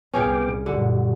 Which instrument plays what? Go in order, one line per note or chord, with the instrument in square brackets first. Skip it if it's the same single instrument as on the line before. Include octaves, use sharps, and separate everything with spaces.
[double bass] C2 [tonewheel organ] B3 G5 D6 [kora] C#4 G#4 F5
[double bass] F#1 A#2 [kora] D3 [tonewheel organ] G3 F#4